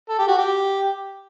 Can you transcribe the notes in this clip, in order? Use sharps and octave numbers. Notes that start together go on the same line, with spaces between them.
A4
G4
F#4
G4